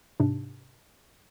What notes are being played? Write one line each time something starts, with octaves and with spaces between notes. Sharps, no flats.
G#2 C3 D4